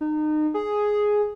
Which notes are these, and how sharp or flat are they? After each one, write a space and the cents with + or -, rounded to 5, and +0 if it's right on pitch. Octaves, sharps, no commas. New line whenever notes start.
D#4 -30
G#4 +5